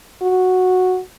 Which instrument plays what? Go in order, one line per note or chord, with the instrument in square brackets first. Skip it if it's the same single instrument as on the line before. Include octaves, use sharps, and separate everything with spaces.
[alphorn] F#4